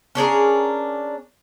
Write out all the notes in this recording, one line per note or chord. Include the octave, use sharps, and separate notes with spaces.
C#4 D4 G#4 A#4